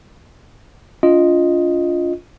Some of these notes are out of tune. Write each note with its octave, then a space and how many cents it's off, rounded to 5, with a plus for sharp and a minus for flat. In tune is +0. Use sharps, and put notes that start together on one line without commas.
D4 -45 F4 +0 D#5 +0